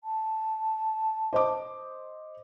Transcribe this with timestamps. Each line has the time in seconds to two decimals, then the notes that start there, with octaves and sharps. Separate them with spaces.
0.04 A5
1.33 C5 D#5 D6